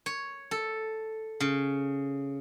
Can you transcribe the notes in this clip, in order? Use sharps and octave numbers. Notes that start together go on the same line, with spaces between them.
C#5
A4
C#3